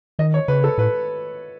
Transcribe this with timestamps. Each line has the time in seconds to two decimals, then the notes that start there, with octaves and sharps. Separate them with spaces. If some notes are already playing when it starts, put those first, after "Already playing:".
0.19 D#3 D#5
0.34 C#5
0.48 C#3 B4
0.64 A4
0.78 A2 B4